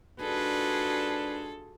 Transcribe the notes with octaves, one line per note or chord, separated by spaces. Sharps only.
G#2 D4 F4 F#4 G#4 A4 B4